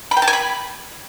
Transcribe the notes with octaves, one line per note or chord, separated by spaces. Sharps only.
B5
G5
A5
G#5
B5